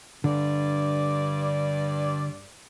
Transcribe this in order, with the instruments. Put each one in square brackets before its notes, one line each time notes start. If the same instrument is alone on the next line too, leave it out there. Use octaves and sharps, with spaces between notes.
[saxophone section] G2 D5 [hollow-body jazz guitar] D3